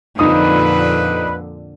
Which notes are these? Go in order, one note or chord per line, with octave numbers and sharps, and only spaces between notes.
F2 A#2 D3 D#4 B4 D#6